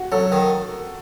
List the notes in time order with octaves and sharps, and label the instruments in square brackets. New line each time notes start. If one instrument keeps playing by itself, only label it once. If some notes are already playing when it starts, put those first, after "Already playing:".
Already playing: [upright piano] F#4
[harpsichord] F#3 [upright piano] A4
[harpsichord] D#3